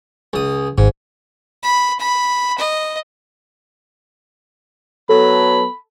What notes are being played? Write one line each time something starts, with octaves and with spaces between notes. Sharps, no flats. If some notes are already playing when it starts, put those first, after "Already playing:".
C#2 D#6
G#1 G#2
B5
B5
D#5
F#3 B3 A4 B5